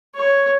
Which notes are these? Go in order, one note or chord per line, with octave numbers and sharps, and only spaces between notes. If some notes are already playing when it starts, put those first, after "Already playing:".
C#5